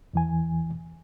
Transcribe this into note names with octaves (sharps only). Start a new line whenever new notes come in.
E2 E3 G#5